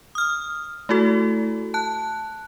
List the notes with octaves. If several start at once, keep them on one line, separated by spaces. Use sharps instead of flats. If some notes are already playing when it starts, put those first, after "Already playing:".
D#6 F6
A3 E4 F#4 A4
A5 F#6